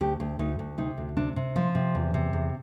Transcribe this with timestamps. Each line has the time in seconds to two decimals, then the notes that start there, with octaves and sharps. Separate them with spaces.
0.01 D2 G4
0.20 D2
0.39 D2 D#4
0.59 D2
0.78 C3 D#4
0.98 D2
1.17 C3 D4
1.36 C3
1.56 F3 F4
1.75 C3
1.95 E2
2.14 C3
2.33 E2